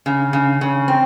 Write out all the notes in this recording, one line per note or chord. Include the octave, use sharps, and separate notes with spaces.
C#3
C#3
C#3
C4